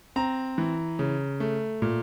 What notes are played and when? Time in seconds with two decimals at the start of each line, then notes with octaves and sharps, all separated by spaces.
0.16 C4 A#5
0.58 E3
0.99 C#3
1.40 A3
1.82 A#2